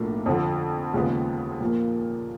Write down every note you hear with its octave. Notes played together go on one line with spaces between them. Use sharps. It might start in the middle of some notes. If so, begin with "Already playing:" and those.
Already playing: B1 A2 F3 A#3 D4
F2 D3 F3
D#2 C#3 F3 G#3 B3
A#2 F3 A#3